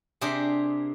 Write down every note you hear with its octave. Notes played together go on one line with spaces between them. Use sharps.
C3 D4 G4 G#4 A#4